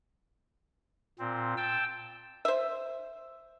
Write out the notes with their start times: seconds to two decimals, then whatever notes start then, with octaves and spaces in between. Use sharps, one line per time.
1.19 A#2 C4
1.57 G5 A5 E6
2.45 C5 E5